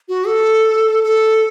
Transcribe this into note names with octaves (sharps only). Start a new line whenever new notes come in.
F#4
A4
A4